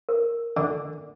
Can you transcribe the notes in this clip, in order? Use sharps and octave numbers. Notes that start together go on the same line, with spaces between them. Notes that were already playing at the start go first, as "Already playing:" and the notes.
A#4
D3